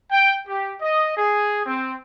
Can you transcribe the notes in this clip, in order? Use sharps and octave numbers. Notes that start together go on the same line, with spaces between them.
G5
G4
D#5
G#4
C4